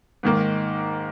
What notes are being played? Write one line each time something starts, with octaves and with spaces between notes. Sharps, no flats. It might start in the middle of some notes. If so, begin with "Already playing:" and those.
G#2 D#3 A#3